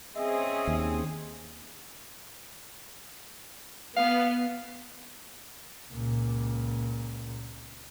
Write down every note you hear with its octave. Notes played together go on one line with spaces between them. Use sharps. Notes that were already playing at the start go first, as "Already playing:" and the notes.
C4 C#4 G#4 D#5 E5
D#2
B3 F5
C#2 A#2